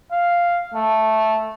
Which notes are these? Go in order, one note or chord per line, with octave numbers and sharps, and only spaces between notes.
F5
A3